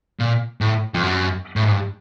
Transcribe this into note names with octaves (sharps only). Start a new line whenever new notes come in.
A#2
A2
F2
F#2
A2
G#2
G2